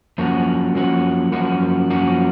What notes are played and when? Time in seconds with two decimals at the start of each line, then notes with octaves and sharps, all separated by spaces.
0.18 F#2 F3 A#3 C#4 F#4
0.75 F#2 F3 A#3 C#4 F#4
1.32 F#2 F3 A#3 C#4 F#4
1.90 F#2 F3 A#3 C#4 F#4